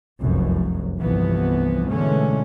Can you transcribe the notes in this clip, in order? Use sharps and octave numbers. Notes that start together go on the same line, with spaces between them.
F1 C2 F#2
G1 C2 E3 F3 B3
B2 D3 E3 G#3 A3 C#4